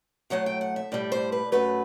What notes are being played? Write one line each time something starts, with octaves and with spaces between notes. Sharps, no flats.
A2 F#3 A3 F#5
G5
F#5
E5
A2 G3 D5
C5
B4
F#2 F#3 A3 B4